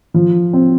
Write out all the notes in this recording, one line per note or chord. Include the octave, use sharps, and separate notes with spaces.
F3
C4